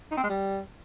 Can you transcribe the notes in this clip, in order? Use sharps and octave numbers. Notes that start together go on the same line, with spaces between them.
D#4
C4
G#3
G3